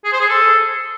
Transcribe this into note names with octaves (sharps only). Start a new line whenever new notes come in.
G#4
C5
G#4
A4